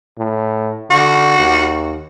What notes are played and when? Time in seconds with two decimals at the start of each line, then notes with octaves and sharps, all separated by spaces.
0.18 A2
0.90 D3 F#4
1.38 D#2